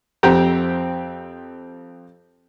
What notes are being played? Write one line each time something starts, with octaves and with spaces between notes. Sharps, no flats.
F2 C4 G4 G5 A#5